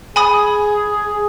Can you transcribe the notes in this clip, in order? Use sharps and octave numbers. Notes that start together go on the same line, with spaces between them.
G#4 G#5 B5 D#6